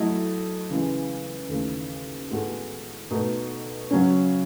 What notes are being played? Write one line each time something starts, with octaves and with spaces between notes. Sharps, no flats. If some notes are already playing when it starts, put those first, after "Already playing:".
Already playing: F#3 A3 E4 A4 D#5
C#3 E3 G#3
D#2 C#3 E3 A3
A2 G#3 B3 F#4 A4
B2 A3 D#4
C#3 F#3 C#4